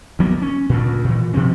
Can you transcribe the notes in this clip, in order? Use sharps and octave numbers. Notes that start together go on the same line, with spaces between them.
D2 F#3 A#3 B3
C#4
D2 G2 A#2
A#2 E3
B2 F3 C4 C#4